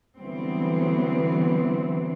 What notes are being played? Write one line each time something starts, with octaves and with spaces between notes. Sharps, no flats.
D3 E3 F#3 G3 B3 C4